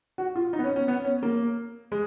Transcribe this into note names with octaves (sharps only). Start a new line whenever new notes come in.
F#4
F4
D#4
B3
C#4
C#4
B3
C#4
A#3
G#3